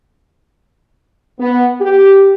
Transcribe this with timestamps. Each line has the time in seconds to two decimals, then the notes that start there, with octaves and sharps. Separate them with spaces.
1.39 B3
1.80 G4